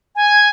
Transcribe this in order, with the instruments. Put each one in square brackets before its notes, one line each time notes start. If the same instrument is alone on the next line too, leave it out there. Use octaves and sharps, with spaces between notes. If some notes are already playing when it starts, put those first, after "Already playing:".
[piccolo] G#5